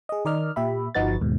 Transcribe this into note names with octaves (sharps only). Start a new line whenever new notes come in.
G#4 D#5
D#3 A#4 D5 D#5 F6
A#2 G4 E5 B5
G1 F3 D#4 F#4 B4 A6
D#2 G#2 B2